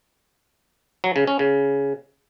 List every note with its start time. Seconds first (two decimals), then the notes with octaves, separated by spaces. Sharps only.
1.04 F#3
1.16 C#3
1.27 C#4
1.39 C#3